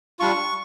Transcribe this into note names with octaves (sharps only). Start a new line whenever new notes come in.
G3 D4 F4 C#6